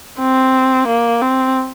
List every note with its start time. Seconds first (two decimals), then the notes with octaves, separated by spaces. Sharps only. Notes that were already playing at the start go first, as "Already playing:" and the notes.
0.20 C4
0.87 A#3
1.21 C4